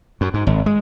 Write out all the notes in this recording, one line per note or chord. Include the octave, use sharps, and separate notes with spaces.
F#2
G#2
G#1
G#3